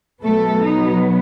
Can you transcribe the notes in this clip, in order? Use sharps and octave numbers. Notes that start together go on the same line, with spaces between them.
B2 F#3 A3 B3 A4
D#4